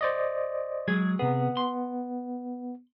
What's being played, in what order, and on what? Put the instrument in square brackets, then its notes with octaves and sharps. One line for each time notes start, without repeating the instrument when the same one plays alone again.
[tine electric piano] C5 D5 D#5
[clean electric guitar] F#3 G#3 G#4 [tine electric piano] G#6
[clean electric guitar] C3 G#4 [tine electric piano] B3
[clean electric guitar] C6